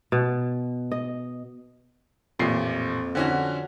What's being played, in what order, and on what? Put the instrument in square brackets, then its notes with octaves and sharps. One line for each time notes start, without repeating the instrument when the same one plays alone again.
[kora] B2
D#5
[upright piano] A1 A#2 C7 [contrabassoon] F2
[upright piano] D3 C#4 F#4